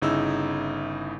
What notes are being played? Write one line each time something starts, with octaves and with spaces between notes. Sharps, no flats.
G1 C#3 D#4 E4 E6